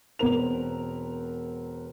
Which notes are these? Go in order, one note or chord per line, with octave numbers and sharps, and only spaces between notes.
E1 B3 C4 A#4 F7